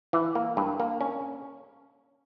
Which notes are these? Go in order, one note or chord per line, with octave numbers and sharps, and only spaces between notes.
E3
A#3
G2
A#3
C#4